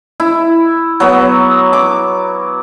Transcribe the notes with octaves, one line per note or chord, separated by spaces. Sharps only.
E4
F#3 B3
D6